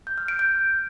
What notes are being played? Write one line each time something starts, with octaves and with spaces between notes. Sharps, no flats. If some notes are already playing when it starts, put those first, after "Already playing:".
G6
F6
D7
G6